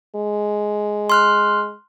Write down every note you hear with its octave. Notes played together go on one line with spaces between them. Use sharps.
G#3
C6 F6 F#6